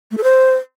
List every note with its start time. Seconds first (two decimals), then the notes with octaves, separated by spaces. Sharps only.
0.11 A3
0.17 A4
0.24 C5